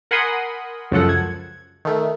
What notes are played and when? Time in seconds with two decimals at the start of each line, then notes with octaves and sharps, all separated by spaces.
0.11 A#4 F#5 G#5 B5 C6 D#6
0.91 C#2 F#2 C#3 F3 A4 F#5
1.09 G#6
1.85 D#3 A3